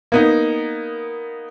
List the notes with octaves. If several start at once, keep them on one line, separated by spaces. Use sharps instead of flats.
A#3 B3 D#4